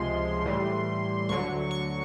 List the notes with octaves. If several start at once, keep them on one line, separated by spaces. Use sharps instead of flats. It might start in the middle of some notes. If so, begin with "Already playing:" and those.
Already playing: C#2 C3 F3 G#3 C6
A2 E3 G3
D2 D3 F#3 C#6
C#6